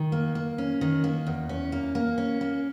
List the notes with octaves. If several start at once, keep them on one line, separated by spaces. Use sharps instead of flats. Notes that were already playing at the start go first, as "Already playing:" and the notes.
Already playing: D#3
A#3
A#3
C#4
D#3
A#3
E2
C#4
A#3
A#3
C#4
A#3